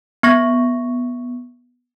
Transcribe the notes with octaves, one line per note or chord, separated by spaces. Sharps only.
B3 C#6 A#6